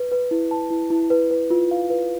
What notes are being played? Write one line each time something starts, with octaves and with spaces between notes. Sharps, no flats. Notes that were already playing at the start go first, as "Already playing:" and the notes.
Already playing: B4
B4
E4
A5
E4
E4
B4
B4
F4
F5
B4